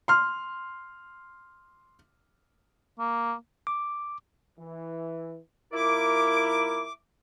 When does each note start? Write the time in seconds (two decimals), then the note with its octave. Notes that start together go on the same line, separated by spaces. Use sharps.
0.08 C6 F6
2.99 A#3
3.67 D6
4.58 E3
5.73 D#2 E4 F4 A#4 D6